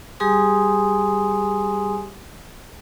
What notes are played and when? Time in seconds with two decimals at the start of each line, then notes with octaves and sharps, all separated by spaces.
0.20 G3 G4 G#4 G#5 C6 D#6